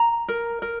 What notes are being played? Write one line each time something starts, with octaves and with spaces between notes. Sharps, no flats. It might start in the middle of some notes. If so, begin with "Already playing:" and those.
Already playing: A#5
A#4
A#4